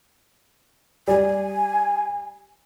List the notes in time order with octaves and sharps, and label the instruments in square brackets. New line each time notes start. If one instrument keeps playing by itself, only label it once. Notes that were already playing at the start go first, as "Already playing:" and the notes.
[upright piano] G3 [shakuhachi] G#5